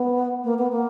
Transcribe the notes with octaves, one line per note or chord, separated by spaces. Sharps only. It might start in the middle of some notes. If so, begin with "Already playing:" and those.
Already playing: B3
A#3
B3
A#3